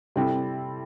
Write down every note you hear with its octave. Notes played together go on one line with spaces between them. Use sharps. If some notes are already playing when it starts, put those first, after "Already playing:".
C3 G3 C4 E4 A4